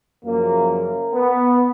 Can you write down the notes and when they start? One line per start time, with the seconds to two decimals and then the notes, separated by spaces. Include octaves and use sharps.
0.24 F#2 C#3 F3 A#3
0.70 A#3
1.13 B3